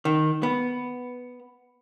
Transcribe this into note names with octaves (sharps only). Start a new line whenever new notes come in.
D#3
B3